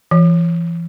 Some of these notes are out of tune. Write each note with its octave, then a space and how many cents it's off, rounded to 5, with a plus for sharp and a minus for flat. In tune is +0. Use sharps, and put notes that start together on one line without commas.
E3 +40